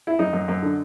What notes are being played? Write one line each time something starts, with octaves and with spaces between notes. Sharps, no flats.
E4
F#2 D#4
F#2
F#2
D3